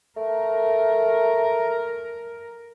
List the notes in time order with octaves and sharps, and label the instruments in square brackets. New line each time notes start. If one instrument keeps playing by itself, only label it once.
[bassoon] A3 [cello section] A#4